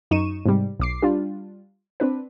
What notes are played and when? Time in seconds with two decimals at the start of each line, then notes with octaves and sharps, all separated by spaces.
0.11 F#2 D#4 C#6 D#7 E7
0.46 G#2 C3 G3
0.80 B1 D6 C7
1.02 G3 D4 F4
2.00 C4 D4 B4